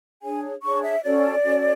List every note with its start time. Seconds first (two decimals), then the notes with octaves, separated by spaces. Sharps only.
0.22 D4 G#4 C#5 G#5
0.62 D4 G#4 C#5 C#6
0.83 E5
1.03 C#4 F#4 A4 C#5 D5
1.44 C#4 F#4 A4 C#5